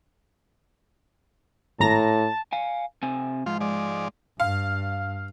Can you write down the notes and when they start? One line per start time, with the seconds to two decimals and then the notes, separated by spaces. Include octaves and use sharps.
1.80 G#1 A2 A5 A#5 A#6
2.52 F5 G#5
3.03 C3 C4 G#5
3.46 G#2 F3 F4
3.61 F3 G#3 D5
4.40 G2 F5